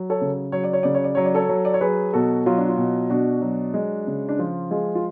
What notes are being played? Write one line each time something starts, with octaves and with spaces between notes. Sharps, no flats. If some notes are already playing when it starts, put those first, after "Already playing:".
Already playing: F#3
A4 C#5
C#3
F#3 C#5
D5
C#5
C#3 D5
C#5
D5
F#3 C#5
D5
A4 C#5
F#3
D5
C#5
F#3 G#4 B4
B2 F#4 A4
F#3 F4
D4
F4
B2
B2 D4 F#4
F#3
G#3
C#3
D4
F3 F4
G#3 F4 G#4
F4